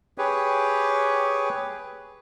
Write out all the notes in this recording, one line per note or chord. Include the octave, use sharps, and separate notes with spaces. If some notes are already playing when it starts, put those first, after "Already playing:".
G4 G#4 B4 C#5